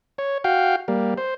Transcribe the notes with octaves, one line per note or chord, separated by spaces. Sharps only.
C#5
F#4 F5 G5
G3 A#3
C5